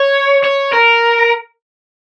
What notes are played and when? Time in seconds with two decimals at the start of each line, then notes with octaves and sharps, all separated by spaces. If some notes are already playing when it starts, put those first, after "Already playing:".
Already playing: C#5
0.44 C#5
0.73 A#4